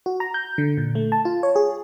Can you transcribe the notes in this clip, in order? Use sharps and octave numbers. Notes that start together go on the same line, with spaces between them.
F#4
A#5
G6
D3
A#2
A3
A5
F4
C#5
G#4